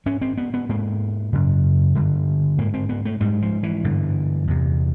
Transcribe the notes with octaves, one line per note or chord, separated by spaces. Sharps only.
G#2 C#4
C4
B3
B3
G#2 A#3
F#2 C#3
G2 D3
G#2 A#3
C4
B3
A3
G#2 G3
F3
E3
G2 D3
E2 C3